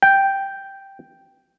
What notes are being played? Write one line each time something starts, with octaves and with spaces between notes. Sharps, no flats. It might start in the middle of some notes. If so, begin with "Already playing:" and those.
G5